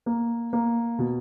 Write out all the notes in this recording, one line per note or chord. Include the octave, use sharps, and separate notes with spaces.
A#3
A#3
B2